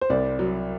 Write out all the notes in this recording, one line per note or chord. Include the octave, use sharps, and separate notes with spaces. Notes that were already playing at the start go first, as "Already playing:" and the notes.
C5
C2 D5
F#3